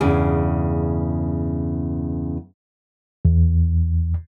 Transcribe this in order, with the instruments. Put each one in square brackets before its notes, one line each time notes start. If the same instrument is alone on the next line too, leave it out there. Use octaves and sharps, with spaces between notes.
[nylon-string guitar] E2 G2 C#3 G#4
[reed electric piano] E2